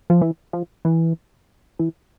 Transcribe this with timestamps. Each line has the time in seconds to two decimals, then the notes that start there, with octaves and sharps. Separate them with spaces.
0.10 F3
0.22 E3
0.53 F3
0.85 E3
1.79 E3